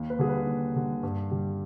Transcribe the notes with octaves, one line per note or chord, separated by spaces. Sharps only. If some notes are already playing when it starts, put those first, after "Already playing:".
Already playing: D#2
B4
D3 G3 G#4
B4
D#2
D3 G3
G2
D3 G3